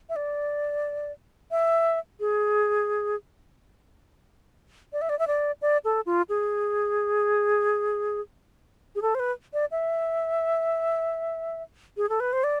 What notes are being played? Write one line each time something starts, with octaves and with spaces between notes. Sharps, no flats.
E5
D5
E5
G#4
D5
E5
D5
E5
D5
D5
A4
F4
G#4
G#4
A4
C5
B4
D5
E5
G#4
A4
B4
C5
D5